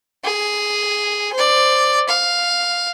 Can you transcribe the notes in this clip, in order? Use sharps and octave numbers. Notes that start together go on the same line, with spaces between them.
G#4
C5 D5
F5